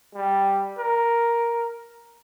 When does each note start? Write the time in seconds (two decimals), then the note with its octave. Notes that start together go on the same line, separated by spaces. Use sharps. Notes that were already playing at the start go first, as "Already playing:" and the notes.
0.15 G3
0.78 A#4